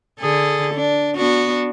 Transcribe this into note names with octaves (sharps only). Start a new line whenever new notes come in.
D3 G#4 A4
D4
B3 D4 F#4